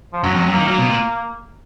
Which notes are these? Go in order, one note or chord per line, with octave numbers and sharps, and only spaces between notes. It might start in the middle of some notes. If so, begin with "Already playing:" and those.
F3
F#2 F#3
F2 F#3
F#2
D#3 A#3
F#3 A#3
B2
A#2